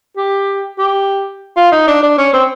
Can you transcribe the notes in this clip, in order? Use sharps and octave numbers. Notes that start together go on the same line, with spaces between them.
G4
G4
F4
D#4
D4
D4
C#4
C4